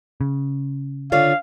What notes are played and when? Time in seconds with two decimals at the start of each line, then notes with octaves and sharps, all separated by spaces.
0.21 C#3
1.12 D3 F4 C#5 F5